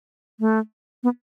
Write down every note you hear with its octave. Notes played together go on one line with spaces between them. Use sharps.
A3
B3